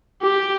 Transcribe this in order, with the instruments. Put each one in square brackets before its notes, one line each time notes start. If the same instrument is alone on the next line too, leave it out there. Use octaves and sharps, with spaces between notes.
[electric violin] G4